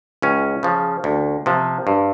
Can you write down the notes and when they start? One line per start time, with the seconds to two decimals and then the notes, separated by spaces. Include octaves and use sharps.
0.22 C#2 C#4
0.63 C#3 F3
1.04 D2
1.46 C3 F3
1.87 G2